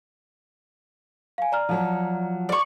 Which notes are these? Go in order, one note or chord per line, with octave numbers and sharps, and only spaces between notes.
F5 G#5
D5 A#5 F6
F3 F#3
D5 C#6